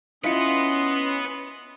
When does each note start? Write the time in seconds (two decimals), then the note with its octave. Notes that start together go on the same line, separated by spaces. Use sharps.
0.24 C#4 E4 F4 B4 D#5 F#5 C6